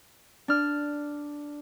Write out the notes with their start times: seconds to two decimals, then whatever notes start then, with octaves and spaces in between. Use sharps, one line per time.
0.48 D4 F6